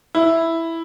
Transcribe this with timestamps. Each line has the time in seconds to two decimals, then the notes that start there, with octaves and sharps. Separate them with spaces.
0.15 E4